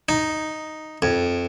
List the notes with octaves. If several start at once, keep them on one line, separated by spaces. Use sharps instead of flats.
D#4
F2